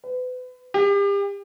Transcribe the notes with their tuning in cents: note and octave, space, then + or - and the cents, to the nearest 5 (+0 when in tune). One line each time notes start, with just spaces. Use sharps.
B4 +35
G4 +35